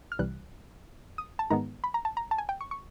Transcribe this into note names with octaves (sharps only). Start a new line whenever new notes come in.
F6
C2 C3 E3 G3 F#6
D#6
A5
G#2 D#3 G#3 B3 A#5
B5
A#5
A5
A#5
A5
G#5
G5
C#6
C#6